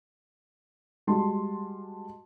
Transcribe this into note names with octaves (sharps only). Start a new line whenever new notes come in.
G3 G#3 F#4 A5 C6